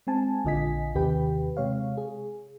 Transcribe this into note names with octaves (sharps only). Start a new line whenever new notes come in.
G#3 C4 G#5 A5
A#1 D3 F4 D#5 G#5 B6
D#2 C3 D#3 G4 B4 G5
C3 G#3 C#5 F5
G#4